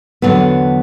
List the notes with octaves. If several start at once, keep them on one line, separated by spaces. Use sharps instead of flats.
E2 D3 F#3 B3